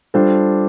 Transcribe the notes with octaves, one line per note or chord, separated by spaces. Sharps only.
G3 D4 F4 A4 C5